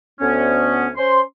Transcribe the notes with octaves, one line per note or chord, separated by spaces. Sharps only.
D2 B3 C#4
C#4 C5 C6